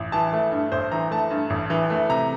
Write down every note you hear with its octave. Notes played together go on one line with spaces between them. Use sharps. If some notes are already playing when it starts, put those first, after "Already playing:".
Already playing: A1
E3 A5
A3
G2
A1 C5
E3 A#5
A3 A5
G2
A1
E3
A3
C3 A#5